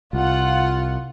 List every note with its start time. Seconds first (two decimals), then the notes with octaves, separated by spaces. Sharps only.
0.13 C2 F4 F#5